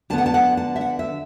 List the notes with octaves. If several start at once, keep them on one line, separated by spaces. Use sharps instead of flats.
D3 B3 A5
F#5
A5
F#5
A5
E5
F#5
E5